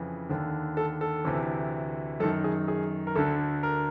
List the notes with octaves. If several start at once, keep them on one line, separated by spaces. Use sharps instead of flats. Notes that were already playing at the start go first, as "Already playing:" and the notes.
Already playing: F2 C#3 E3
D#2 D3
A4
A4
D2 C3 E3
F#2 D#3 A4
G#4
G#4
A#4
D2 D3 A4
A#4